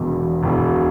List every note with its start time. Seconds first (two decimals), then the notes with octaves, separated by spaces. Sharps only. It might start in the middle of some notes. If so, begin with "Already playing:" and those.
Already playing: E1 E2 B2
0.43 E1 E2 B2